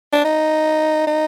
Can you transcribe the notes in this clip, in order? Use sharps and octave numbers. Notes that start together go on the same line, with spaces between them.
D4
D#4
D#4